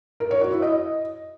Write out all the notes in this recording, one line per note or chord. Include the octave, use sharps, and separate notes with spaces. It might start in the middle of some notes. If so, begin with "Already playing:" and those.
A#4
C#5
F#4
E4
D#5